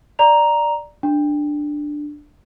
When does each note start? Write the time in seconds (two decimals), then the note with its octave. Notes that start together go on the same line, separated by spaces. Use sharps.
0.19 D5 A#5 F7
1.03 D4